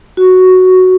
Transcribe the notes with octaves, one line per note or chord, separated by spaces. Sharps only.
F#4